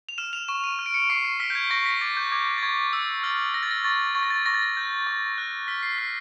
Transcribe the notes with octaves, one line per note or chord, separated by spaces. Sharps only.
F7
F6 E7
F7
C#6 E7
D#7
F6
D7
C#7
C#6 C7
C7
F6 B6
G6
G#6
C#6 A#6
B6
D6 A6
G6
D6 G#6
G#6
A6
C#6 G#6
E6
F6 A6
F6 A#6
A6
A#6
C#6 A6
C#6 A6
A#6
A6
C#6 A#6
A6
A#6
G6
C#6
F#6
F6 B6
C7
B6
F6 C7